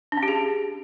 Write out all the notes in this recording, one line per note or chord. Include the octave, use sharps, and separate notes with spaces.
D4
C#4
G4
G#4